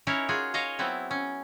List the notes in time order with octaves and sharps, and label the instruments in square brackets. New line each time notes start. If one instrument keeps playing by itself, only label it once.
[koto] C#4 D#4 E4 A#4 C#5
F4 F#4 G#4
C#5 D#5 F5 A#5
F#3 B3 C4 E4
C#4